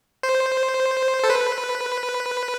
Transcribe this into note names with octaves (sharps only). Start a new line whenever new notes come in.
C5
A4
B4